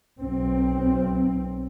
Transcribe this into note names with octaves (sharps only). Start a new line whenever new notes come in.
B1 C4